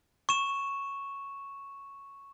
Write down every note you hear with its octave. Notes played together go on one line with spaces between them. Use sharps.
C#6 E7